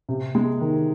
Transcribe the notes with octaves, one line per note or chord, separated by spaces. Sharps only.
C3
G#3
D#3